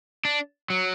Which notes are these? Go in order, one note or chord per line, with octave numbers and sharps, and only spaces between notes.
D4
F#3